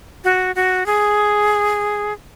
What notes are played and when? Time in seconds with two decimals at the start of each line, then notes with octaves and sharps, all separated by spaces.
0.24 F#4
0.55 F#4
0.86 G#4